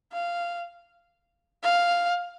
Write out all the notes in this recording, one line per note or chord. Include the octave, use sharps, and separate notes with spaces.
F5
F5